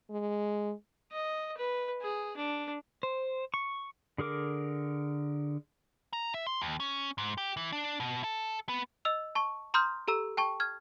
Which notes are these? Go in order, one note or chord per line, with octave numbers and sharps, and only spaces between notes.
G#3
D#5
B4
G#4
D4
C5
C#6
D3 G#4 A#4 D6
A#5
E5
C6
D#2
C#4
G#2
G4
E3
D4
B2
A4
B3
D#5 E6 F7
A5 C#6
A#5 C6 D#6 F6 G6
G4 A4 A#5 E6
G5 A5 C#6
F6 G#6